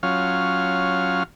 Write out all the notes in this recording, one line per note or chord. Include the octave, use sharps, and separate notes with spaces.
F#3 C#4 F4 F5